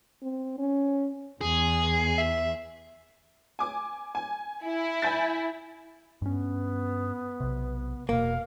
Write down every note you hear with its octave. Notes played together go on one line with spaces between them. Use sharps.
C4
C#4
E2 G#4
E5
G#5 D6
G#5
E4
G#5 G6 A6
G2 B3 C#4
B1 C3
E1 B2 A#3 F5